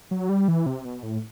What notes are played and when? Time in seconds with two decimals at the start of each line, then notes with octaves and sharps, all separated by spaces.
0.11 F#3
0.29 G3
0.48 E3
0.66 C3
0.85 B2
1.03 A2